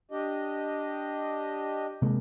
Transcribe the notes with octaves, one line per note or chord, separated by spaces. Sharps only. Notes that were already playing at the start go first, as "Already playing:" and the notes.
D4 G4 D#5
C3 G#3 A#3